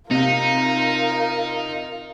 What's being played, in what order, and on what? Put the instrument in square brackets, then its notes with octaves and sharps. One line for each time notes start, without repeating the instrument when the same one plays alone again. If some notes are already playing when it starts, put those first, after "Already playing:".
[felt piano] C3 F5 [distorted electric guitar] D#4 [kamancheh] F4 A#4